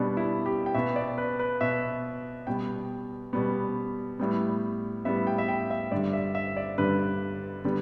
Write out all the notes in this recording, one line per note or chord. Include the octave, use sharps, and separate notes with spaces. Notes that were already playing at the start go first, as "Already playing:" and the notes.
Already playing: B2 G3 B3 D4
E4
G4
G5
B2 B3 E5
D5
B4
B4
B2 B3 E5
B2 G3 B3 G5
B2 G3 B3
A2 G3 B3
A2 G3 B3 E5
G5
E5
G5
E5
G2 D3 G3 D5
E5
E5
D5
G2 D3 G3 B4
D3 G3 B3